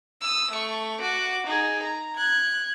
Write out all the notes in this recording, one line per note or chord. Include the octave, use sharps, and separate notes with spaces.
D#6 E6
A3 C#6
F#4 D6
D#4 G#4
A#5
F#6 G#6